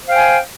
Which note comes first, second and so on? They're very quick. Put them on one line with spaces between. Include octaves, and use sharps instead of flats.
C5 F5 G5 G#5